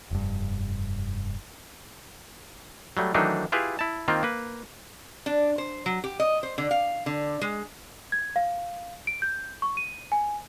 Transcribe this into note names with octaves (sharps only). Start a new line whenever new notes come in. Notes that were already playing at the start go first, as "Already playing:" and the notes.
F1 G2
F#3 G3 A3
D#3 E3 F#3 A3 D4 D#4
E4 F4 G4 G#4 B4
E4 A5
D#3 A#3 C4 F4
A#3 B4
D4
C5
F#3
G4
D#5
C5
D3
F5
D3
G#3
G#6
F5
D7
G6
C#6
D#7
G#5